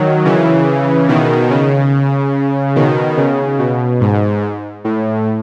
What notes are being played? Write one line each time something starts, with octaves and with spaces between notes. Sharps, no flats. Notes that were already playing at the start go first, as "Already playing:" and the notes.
Already playing: D#3 F#3
C#3 E3
B2 D#3
C#3
B2 D#3
C#3
B2
G#2
A2